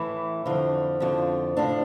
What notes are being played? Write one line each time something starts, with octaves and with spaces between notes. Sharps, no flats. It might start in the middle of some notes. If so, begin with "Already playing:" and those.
Already playing: A2 E3 E4
F2 D3 F3
F2 D3 F3
A2 F3 D4